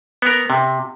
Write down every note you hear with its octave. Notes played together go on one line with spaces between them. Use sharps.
B3 A#4
C3